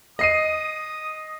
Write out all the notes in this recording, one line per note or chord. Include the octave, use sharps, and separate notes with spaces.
D#5 D#6 C7 D#7